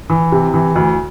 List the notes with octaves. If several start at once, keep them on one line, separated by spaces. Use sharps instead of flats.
E3
C3
E3
D2